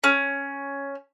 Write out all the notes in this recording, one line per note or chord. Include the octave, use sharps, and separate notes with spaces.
C#4